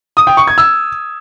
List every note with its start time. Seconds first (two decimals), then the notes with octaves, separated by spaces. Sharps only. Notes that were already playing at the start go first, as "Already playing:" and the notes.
0.17 D#6
0.27 G5
0.37 C#6
0.47 G#6
0.58 E6